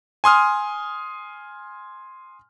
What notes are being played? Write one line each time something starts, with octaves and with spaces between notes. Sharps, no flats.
G#5 C6 D#6 F6